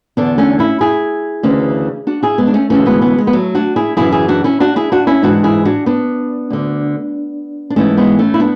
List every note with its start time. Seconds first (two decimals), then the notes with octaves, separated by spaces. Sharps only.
0.17 E2 D3 B3 D4
0.38 A3 C#4
0.59 C#4 E4
0.81 E4 G#4
1.43 D2 C#3 E3
2.07 D4 F#4
2.23 E4 G#4
2.38 G#3 B3
2.47 D4
2.54 A3 C#4
2.70 D2 C#3 E3 A3 C#4
2.86 G#3 B3
3.01 G#3 B3
3.18 G#3
3.27 B3
3.33 F#3 A3
3.55 D4 F#4
3.76 E4 G#4
3.97 F#2 C#3 E3 E4 G#4
4.12 E4 G#4
4.28 D4 F#4
4.44 C#4 E4
4.60 D4 F#4
4.76 E4 G#4
4.92 D4 F#4
5.07 C#4 E4
5.23 G#2 E3 D4 F#4
5.44 E4 G#4
5.65 D4 F#4
5.86 B3 D4
6.50 D2 D3
7.70 D4
7.76 G#2 E3 A3 C#4
7.98 G#3 B3
8.19 A3 C#4
8.34 E4
8.40 B3 D4